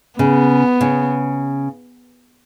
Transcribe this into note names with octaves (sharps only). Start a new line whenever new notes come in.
C#3 B3
C#3